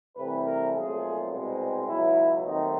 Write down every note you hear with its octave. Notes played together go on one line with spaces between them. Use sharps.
C2 C3 E3 A3 C4 B4
A#4
B1 A#2 F3 A3 C4 G#4
C2 B2 G#3 C4
C#2 B2 F#3 E4
D#2 D#3 F#3 A3 C4 D#4